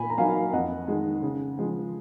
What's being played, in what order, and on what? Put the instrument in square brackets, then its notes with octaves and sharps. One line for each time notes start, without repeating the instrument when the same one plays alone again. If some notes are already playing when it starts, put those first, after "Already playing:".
Already playing: [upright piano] A#2 G#5 B5
A#5
F#3 A#3 D#4 F5 G#5
F2 D#5 F#5
D#3 G#3
C#3
F3 G#3